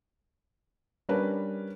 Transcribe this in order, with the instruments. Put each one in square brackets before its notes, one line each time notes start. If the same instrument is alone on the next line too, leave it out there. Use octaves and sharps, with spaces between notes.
[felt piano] G3 C#4 D4 A#4 B4